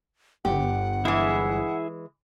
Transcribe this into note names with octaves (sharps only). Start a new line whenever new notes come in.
G1 G4 F#5
E3 G#3 E4 G#4 E5